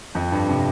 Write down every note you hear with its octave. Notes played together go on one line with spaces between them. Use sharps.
F2
G2
C3